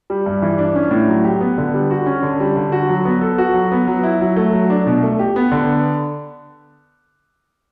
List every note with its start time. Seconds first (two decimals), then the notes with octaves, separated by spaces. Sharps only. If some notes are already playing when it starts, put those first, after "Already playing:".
0.10 G3
0.26 G2
0.42 E3
0.58 D4
0.76 C#4
0.91 A2
1.08 F#3
1.24 G4
1.41 B3
1.58 D3
1.74 G3
1.91 F#4
2.06 C#4
2.22 D3
2.40 G3
2.56 D3
2.72 F#4
2.89 F#3
3.05 B3
3.21 A4
3.38 F#4
3.54 F#3
3.71 B3
3.87 F#3
4.03 E4
4.21 F#3
4.36 A3
4.53 F#3
4.70 D4
4.86 B2
5.03 A3
5.19 G4
5.36 B3
5.51 D3